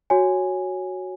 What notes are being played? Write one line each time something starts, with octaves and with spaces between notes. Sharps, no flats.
F#4 C#5 G#5